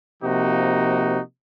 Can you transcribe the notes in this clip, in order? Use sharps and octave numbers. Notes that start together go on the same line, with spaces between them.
C3 F3 A#3 D#4 F#4